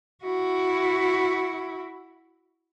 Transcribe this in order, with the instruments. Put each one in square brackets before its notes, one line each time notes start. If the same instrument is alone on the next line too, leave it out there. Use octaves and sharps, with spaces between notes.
[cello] E4 F#4